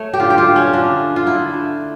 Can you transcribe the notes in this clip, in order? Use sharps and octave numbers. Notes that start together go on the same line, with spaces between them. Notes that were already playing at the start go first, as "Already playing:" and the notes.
Already playing: A3 C#5
G4
D3 F4
G4
F4
A3
C#4
D3 D4
A3
F4
D3 E4
A3